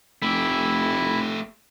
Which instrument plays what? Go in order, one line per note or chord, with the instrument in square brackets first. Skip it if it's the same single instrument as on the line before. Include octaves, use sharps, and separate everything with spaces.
[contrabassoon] F1 [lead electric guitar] A3 G4 [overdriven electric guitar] E4